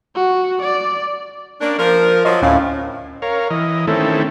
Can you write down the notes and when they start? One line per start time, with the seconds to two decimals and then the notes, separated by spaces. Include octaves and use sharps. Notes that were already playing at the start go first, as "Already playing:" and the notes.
0.15 F#4
0.62 D5
1.61 A#3 C#4 D4
1.79 F3 A#4
2.25 F3 F#3 D#5
2.42 D2 A2 C#4 F5
3.22 A#4 C#5 F5
3.50 E3 D#5
3.87 D#3 A3 C4 C#4 E4 A4